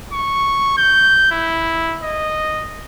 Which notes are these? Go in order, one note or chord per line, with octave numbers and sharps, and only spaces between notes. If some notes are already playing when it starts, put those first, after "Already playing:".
C#6
G6
E4
D#5